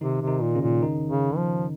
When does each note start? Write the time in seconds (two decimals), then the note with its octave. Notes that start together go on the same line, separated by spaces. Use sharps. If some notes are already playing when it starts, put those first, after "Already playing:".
0.01 C3 D#3 D#4
0.22 C3
0.28 D#3 D#4
0.41 A#2
0.55 C#3 C#4
0.61 A#2
0.82 D#3 D#4
1.09 C#3
1.37 F3